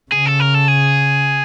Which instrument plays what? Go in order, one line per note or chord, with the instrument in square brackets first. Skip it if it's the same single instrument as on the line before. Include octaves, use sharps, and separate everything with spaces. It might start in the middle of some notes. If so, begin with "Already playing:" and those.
[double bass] C#3 [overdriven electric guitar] G#4
[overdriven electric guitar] A4
A#4
A4
G#4